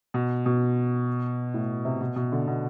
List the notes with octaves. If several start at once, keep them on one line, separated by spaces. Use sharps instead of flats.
B2
B2
A2
C3
B2
B2
D3
B2